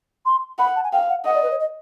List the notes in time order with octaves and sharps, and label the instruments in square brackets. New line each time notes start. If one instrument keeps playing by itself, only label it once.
[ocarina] C6
[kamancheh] F#5 [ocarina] B5
[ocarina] A5
G#5
[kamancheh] F5 [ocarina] G5
[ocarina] F#5
[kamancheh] D#5 [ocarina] F#5
[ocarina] D5
B4
C#5
D#5